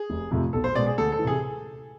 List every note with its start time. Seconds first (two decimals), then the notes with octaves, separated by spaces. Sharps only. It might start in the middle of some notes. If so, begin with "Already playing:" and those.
Already playing: G#4
0.10 F1
0.31 F2 C3 F3 A3
0.53 B1 A4
0.64 C5
0.75 B2 G#3 D5
0.86 G#4
0.98 D2 A4
1.12 A4
1.19 E3
1.24 C3 G#4